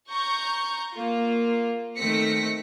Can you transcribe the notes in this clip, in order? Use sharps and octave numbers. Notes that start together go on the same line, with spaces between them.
A#5 C#6 G6
A#3 F4
D#3 A3 C4 A#6 B6 C#7